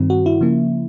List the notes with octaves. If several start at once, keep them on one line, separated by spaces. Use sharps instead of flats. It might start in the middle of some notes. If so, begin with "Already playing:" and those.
Already playing: G2 D#3 G3 C4
F#4
E4
C#3 F3 A#3